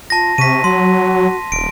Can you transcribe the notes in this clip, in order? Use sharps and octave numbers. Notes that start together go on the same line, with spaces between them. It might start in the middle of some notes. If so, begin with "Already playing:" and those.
F4 A5 A#6
C3 C#6 B6 D#7
F#3 F#4 C6
D#1 D7